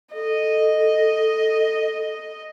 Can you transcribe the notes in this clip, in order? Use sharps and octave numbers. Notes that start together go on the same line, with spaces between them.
A4 D#5